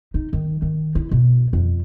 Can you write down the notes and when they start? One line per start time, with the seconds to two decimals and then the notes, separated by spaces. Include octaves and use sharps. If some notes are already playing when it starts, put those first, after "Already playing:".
0.14 D#4
0.33 D#3
0.62 D#3
0.95 E4
1.11 B2
1.53 F2